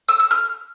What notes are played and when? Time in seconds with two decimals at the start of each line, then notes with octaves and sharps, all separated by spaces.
0.09 E6
0.20 E6
0.31 F6